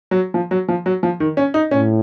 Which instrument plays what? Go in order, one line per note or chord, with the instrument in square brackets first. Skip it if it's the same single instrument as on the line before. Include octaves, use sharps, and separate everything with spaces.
[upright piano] F#3
F3
F#3
F3
F#3
F3
D#3
C#4
D#4
[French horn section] A2 [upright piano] C#4